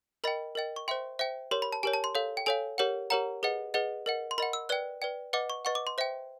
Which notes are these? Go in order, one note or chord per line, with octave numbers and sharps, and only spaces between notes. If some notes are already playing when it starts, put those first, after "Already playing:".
A#4 D#5 G5 B5
A#4 D#5 G5
C#6
C5 E5 G5 C6
C5 E5 G5
G4 A#4 C#5 C6
B5
A5
G4 A#4 C#5 G#5
A5
C6
A4 C#5 F5
G5
A4 C#5 F5 G#5
G4 A#4 C#5 F#5
G4 A#4 C#5 F#5 A#5
G#4 B4 D#5 F#5
G#4 B4 D#5 F#5
A#4 D#5 F#5
C6
A#4 D#5 F#5 B5
E6
B4 D5 G5 F#6
B4 D5 G5
B4 D#5 F#5 D6
C#6
B4 D#5 F#5 C#6
D6
C6
C5 E5 G5